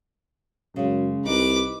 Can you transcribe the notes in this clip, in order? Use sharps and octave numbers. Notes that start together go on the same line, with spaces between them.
F#2 C#3 G#3
C2 D#4 B4 D6